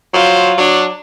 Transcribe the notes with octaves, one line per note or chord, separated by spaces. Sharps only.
F#3 F4 C5
F#3 D4